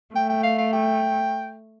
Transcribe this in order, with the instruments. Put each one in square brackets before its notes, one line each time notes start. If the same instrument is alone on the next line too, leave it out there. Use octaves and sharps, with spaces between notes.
[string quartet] A3 [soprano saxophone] G5
[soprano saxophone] G5
F5
F5
G5